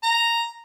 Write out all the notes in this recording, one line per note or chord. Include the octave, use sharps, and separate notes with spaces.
A#5